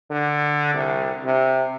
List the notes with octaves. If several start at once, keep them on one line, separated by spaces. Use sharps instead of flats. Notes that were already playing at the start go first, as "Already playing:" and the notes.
D3
C2
C3